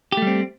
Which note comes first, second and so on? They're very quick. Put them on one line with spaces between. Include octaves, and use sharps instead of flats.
G4 A3 G3 C4